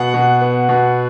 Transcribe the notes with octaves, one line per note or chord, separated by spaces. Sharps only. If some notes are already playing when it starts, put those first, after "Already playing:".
Already playing: B2 F#5
B2
B3
B2